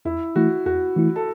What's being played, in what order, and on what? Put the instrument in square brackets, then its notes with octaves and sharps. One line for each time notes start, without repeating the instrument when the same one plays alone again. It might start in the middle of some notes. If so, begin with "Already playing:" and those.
[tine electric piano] E2 [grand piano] E4
[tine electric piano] E3 A3 E4 [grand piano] F#4
[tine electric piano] E2 [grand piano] F#4
[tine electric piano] E3 A3 E4
[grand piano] A4